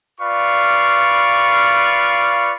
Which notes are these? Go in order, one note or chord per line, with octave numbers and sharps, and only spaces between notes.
F4 B4 D5 F5 C#6